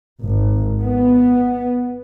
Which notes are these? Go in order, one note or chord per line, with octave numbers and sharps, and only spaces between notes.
G#1
B3